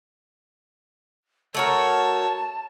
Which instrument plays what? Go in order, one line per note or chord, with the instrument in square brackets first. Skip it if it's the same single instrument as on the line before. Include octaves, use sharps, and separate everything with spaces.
[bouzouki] A3 F#4 A#4 [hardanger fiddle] C#5 [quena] A5